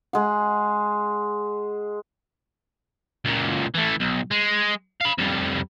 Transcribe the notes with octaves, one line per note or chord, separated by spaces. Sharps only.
G#3 F#5
C#2 A#2
E3 A3
B1
G#3
F5 B5
F2 G3